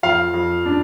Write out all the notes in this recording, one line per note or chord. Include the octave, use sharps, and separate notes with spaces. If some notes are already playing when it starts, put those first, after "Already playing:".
F2 F5
F2
D4